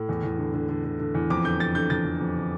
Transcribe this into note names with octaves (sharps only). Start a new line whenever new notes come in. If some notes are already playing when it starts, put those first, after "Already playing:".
Already playing: A2
E2
E2
D3
D3
D3
D3
D3
E2
F2 D6
D3 G6
F2 A6
D3 G6
F2 A6
F2
F2
D3